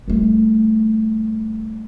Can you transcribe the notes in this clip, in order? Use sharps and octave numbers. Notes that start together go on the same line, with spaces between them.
G3 A3